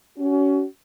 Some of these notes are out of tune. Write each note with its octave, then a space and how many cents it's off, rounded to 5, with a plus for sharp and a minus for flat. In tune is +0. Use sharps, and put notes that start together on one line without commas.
C#4 +25 F#4 +30